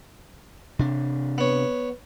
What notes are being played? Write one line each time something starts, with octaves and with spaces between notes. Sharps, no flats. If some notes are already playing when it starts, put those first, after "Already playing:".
C3 D4
B3 C#5